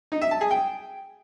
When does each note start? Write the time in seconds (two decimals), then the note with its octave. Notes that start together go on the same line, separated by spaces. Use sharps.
0.12 D#4
0.21 E5
0.31 A5
0.41 G#4
0.51 G5